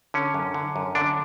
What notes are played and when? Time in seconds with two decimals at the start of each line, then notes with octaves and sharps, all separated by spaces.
0.14 D3 C#4
0.34 F#2
0.54 D3
0.76 F#2
0.95 D3 D4